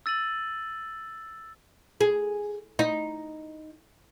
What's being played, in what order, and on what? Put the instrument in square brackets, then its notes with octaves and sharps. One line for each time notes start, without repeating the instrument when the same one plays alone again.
[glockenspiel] E6 A6 D#7 F#7
[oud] G#4
D#4